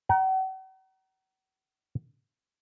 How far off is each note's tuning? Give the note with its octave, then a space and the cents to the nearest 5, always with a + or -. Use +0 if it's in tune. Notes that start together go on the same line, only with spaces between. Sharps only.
F#5 +45 A#5 +15